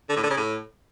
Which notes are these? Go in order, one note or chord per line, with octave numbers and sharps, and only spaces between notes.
D3
A2
D3
C#3
A2